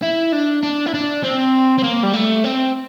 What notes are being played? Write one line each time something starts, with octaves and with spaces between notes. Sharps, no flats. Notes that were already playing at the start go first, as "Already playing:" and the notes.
E4
D4
D4
E4
D4
C4
C4
A#3
G3
A3
C4